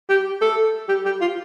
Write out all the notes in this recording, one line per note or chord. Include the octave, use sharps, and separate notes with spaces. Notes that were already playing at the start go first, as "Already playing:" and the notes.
G4
A4
G4
G4
F4